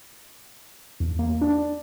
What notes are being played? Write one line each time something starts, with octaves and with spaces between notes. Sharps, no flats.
E2
A#3
D4